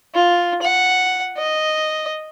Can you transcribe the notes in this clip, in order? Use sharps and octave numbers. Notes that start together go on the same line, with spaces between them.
F4
F#5
D#5